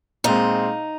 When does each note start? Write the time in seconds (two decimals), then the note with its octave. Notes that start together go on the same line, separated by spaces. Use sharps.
0.24 A#2 G#3 C4 D#4